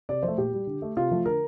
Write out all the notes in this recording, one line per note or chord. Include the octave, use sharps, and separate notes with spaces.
C3 D5
F3 C5
A3
A#2 G4
G3
D3
A3
C3 F4
F3 A3
D3 A#4